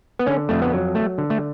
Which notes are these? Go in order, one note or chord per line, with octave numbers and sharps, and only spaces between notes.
B3
D3 C#4
F2 A3
B3
F#3
A3
D3
A3